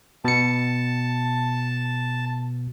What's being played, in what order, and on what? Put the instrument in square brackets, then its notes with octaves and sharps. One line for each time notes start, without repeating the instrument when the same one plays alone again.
[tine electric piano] B2 C#7 [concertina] A5